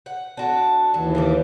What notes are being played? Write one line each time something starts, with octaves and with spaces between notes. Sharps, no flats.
F#5
D4 F#4 A4
D#2 E3 F#3
C#3 G3 D5